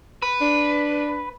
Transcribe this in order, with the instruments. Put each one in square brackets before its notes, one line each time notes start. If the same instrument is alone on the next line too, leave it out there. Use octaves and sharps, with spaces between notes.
[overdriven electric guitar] B4
[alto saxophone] D4